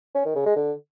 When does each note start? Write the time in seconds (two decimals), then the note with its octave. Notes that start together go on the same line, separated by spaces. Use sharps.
0.15 C#4
0.25 D#3
0.36 C#3
0.46 G#3
0.56 D3